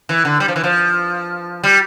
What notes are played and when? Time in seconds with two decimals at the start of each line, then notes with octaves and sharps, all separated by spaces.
0.09 E3
0.25 D3
0.40 G3
0.48 F3
0.56 E3
0.64 F3
1.64 G3